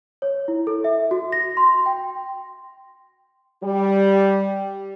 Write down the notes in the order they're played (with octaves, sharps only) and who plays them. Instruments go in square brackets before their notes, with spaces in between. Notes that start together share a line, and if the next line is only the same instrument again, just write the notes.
[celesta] C#5
E4
A4
E5
F#4
A#6
C6
G5
[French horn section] G3 G4